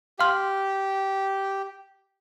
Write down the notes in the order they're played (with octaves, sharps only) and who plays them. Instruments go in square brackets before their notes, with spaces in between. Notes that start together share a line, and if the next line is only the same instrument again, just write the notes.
[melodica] G4 [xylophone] F5 C6 F6